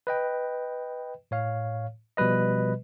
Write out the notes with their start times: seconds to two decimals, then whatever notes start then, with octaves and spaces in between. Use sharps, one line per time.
0.07 B4 D#5 G5
1.31 A2 C#5 F5
2.17 B2 F3 G3 B4 D#5